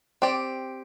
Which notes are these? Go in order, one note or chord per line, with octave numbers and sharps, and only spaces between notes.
C4 G4 D5